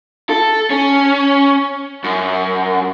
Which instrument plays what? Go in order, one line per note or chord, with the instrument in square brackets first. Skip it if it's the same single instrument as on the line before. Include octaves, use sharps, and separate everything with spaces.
[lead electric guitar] A4
C#4
F#2